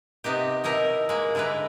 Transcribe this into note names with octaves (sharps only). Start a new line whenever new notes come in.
C3 B3 D#4 G4
B2 D#4 E4 A#4
G#3 A#3
D3 G#3 E4 A#4 B4